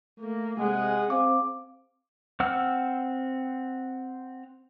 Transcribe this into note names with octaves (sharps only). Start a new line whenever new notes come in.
A3 A#3
C3 G#3 G#4 F#5
C4 F5 D6
C4 F#5 E6 F6